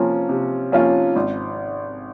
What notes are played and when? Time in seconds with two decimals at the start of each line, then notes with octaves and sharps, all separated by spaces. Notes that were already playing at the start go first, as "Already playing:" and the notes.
Already playing: C3 F3 A#3 C#4 F4
0.29 C3
0.72 F3 A#3 C#4 F4
1.16 G#1